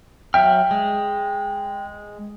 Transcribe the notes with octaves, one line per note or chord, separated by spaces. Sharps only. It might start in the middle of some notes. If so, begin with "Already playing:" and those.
F#3 E5 G5 F6
G#3